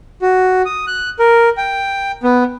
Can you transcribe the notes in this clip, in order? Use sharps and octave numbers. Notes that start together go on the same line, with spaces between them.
F#4
D#6
F#6
A#4
G5
B3